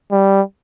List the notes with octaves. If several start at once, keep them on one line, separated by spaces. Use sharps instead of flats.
G3